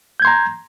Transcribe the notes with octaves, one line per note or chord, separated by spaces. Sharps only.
A#5 C6 G6 G#6